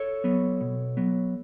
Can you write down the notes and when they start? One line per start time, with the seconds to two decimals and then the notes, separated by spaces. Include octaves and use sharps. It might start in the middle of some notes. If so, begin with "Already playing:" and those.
Already playing: A4 C#5
0.24 F#3 B3
0.61 B2
0.97 F#3 B3